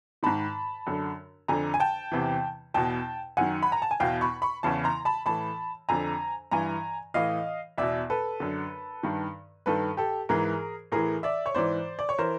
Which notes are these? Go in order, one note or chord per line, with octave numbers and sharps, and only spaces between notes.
G#2 D#3 A5 B5
F#2 D3
F2 D3 G#5 A#5
G#5
G5 A5
E2 C3 E3
E2 B2 G5 A5
F#2 D#3 F#5 G#5
B5
A#5
A5
G#5
E2 B2 F5 G5
B5 C#6
B5 C#6
E2 C#3 E3 A5 B5
A#5 C6
A5 B5
A2 E3 A5 B5
F2 D3 G#5 A#5
G2 E3 G#5 A#5
A2 E3 D#5 F5
E2 B2 D5 E5
A4 B4
F#2 D3
G2 D#3
G2 D#3 A4 B4
G4 A4
G#2 E3 G#4 A#4
A2 E3 G#4 A#4
D5 E5
C#5
G#2 E3 C5 D5
D5
C#5
E3 A#4 C5